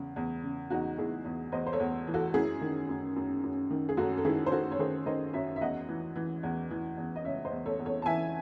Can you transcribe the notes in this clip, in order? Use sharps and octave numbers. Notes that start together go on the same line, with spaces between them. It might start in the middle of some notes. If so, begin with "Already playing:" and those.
Already playing: E2 C#3
E2
C#3
E2 D#4 F#4
E2 E4 G#4
E2
E2 C5 D#5
C5
A4 C#5
E2
E3
F#4 A4
F#2 E4 G#4
D#3
F#2
F#2
F#2
D#3
G#4
F#2 F#4 A4
A4
D#3 E4 G#4
C5
D#3 F#4 A4
C#5
D#3 G#4 C5
D#3 C5 D#5
F#2 C#5 E5
E5
E2 D#5 F#5
E3
E3
E2
E3
E2
D#5
C#3 C#5 E5
C5 D#5
E2
A4 C#5
E2
A4 C#5
A5
E3 E5 G#5